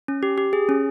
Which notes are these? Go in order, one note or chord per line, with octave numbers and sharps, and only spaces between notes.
C#4
G4
G4
G#4
C#4